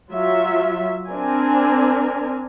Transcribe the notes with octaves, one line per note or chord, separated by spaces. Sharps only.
F#3 F4 E5
C4 D4 A#4 G#5